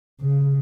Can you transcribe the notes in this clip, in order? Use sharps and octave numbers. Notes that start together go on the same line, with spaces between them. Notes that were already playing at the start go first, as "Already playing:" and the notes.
C#3